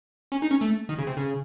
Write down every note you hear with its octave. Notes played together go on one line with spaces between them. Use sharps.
C#4
D#4
C#4
A3
D#3
C#3
C3
C#3